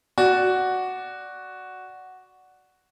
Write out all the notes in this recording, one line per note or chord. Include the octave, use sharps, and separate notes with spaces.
F#4 D5